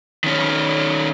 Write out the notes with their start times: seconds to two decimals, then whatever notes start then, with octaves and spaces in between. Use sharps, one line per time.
0.24 D#3 C#4